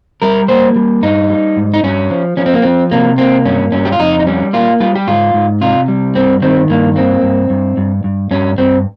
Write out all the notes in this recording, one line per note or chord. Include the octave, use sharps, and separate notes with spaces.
G3 A#4
A#3 C5
G3
G2 D#4
G3
G#2
D#4
G2 C#4
F3
F3 C#4
C4
A#3
F3 C4
C3 A#3
A#3 C4
G2 C#4
G2 C#4
G4
F4
F2 D#4
D#4
G3 C#4
A#3 F4
G3 F4
G4
G#2 F4
G#2
C3 F4
G3
G2 C4
D#3 C4
G2 A#3
A#3 C4
G2
G2
G2
G2
G2 C#4
G2 C4